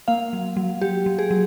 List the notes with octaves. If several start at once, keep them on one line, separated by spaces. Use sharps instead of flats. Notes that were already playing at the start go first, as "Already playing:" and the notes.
A#3 F5
F#3
F#3
F#3 G4
F#3
G#4
F#3